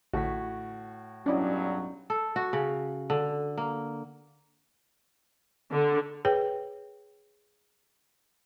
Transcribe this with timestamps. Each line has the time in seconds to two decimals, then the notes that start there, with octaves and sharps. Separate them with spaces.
0.13 A1 A2 D3 F#4 B6
1.26 B1 G2 F#3 C#4 D4 E4 D5 D#5
2.10 A4
2.36 F#4
2.53 C#3
3.10 D3
3.58 A#3
5.71 D3
6.25 G#4 B4 C#5 G5